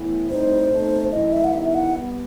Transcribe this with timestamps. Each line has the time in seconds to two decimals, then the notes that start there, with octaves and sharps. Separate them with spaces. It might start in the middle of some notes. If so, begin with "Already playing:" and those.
Already playing: A2 E3 B3 E4
0.29 A2 G3 C4 D#4 C5
0.71 B2 A3 C4 D#4
1.11 F#2 E3 A3 E4 D#5
1.33 E5
1.44 F#5
1.53 D#3 G3 B3 E4 E5
1.69 E5
1.74 F#5
1.94 G3 B3